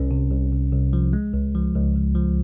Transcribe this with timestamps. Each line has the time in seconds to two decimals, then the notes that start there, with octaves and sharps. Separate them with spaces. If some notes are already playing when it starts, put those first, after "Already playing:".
Already playing: C2 C#4
0.11 C3
0.31 C2
0.52 C2
0.72 C2
0.93 F3
1.13 G#3
1.34 C#2
1.55 F3
1.75 C#2
1.95 C#2
2.15 F3